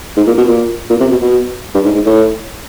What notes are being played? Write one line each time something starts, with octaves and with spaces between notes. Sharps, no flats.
G#2
A#2
B2
A#2
A#2
C3
B2
B2
G2
G#2
G#2
A2